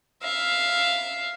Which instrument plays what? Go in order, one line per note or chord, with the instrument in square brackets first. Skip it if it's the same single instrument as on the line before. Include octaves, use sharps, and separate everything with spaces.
[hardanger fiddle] E5 F5